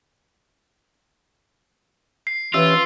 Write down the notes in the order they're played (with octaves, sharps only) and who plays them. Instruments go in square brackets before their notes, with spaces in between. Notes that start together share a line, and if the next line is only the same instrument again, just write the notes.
[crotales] C7
[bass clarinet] E3 [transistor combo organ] C#4 G4 E5 [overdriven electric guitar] F4 [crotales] E6